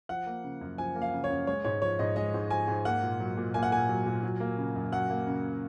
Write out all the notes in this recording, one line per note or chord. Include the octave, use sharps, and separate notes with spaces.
F3 F#5
A#3
C#3
F#2
F3 G#5
A#3
F5
C#3
C#5
F#2
G#3 C#5
G#2 C#5
F3 C#5
G#2 D#5
G#3 D#5
G#2
F3 G#5
G#2
A#3 F#5
A#2
F#3
A#2
A#3 G#5
F#5
A#2 G#5
F#3
A#2
F#3
A#3
C#3
F#2
F#3 F#5
A#3
C#3